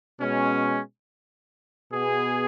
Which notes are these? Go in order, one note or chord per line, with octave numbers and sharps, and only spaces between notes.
B2 G#3 C#4
B2 B3 G#4